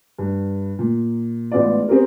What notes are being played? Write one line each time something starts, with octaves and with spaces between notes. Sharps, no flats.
G2
A#2
A1 G#3 B3 F4 D5
B3 C4 G4 G#4 A#4